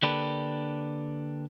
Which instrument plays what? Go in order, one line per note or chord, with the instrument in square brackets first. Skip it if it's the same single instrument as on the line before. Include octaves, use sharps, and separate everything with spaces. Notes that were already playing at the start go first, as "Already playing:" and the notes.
[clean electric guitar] D3 A#3 D4 G4 A4 B4